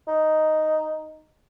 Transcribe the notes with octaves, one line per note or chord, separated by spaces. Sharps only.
D#4